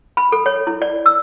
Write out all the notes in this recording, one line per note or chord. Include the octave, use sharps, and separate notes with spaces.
B5
A4
C#5
E4
D5
E6